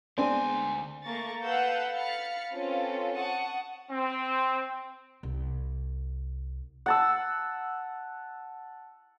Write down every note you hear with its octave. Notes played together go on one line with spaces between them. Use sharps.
D2 G#3 B3 C4 D4 G#5
A3 A#3 A#5 C#6 A6
A4 B4 F5 F#5 E6 G6
F5 B5 F6 A6 C#7
C4 C#4 F4 A4 B4
F#5 A5 C#6 D#6
C4
C2
F#5 A5 E6